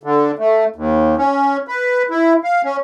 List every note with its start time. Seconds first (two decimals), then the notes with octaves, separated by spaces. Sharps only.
0.03 D3
0.39 A3
0.76 D#2
1.18 C#4
1.68 B4
2.10 E4
2.44 F5
2.64 C#4